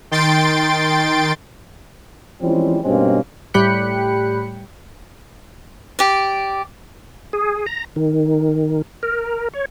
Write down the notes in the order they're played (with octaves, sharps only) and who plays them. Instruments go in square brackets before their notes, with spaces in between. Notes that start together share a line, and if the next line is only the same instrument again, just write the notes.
[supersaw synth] D#3 G5 C6 A6 D7
[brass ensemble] E3 F3 G3 G#3 C4 C#4
G2 B2 G#3 A#3 C4 C#4
[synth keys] A2 G3 G5 B5 F#6 C#7
[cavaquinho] G4 D5
[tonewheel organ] G#4
A#5
D#3
A#4
C#5